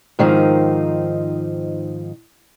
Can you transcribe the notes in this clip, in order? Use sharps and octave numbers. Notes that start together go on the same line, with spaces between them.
G#2 D#3 F3 C4 D#4